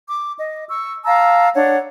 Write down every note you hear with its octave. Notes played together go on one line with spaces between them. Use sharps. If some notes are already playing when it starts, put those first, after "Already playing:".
D6
D#5
C#6 E6
F5 A5 A#5 E6
D4 C#5 F#5